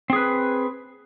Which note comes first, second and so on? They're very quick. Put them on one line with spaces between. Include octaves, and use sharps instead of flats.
C4 G#4 B4